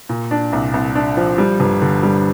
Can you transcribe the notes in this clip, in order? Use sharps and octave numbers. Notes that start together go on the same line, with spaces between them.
A#2
D4
C2
C2
D4
F3
G3
G1
D3
G3